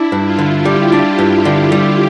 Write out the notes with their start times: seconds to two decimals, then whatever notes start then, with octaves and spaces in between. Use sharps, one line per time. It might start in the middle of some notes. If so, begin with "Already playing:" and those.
Already playing: D4 E4
0.12 G2
0.25 F4
0.39 D3
0.65 G3 G4
0.92 D4
1.19 G2
1.45 D3
1.72 G3